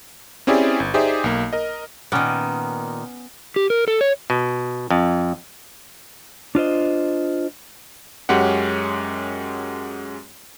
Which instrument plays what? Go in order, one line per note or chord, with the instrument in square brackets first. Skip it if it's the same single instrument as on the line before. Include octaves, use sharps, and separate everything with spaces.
[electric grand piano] C4 C#4 E4 G4 G#4 D5
G1
D#4 G4 G#4 C5 D5 E5
B1 A#3
A#4 D#5
[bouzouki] A#2 D#3 [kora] B3 C#4
[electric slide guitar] G4
A#4
A4
C#5
[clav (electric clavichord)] B2
F2
[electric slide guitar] D4 F4 C5 D#5
[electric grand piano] F#2 G#3 C#4 G4 F#5